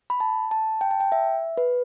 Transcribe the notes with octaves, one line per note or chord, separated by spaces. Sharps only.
B5
A5
A5
G5
A5
G5
E5
B4